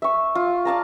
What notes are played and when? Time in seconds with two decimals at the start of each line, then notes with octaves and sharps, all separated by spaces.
0.02 E5 C#6
0.35 F4
0.65 D5 F5 A5 A#5